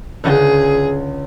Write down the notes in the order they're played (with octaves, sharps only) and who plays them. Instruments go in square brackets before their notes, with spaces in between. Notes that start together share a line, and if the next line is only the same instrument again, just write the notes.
[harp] C#2 D3 G6 [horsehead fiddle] G#4